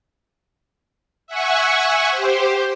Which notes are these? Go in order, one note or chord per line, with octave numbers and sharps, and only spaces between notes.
E5 F#5 G#5 C#6
G4 C5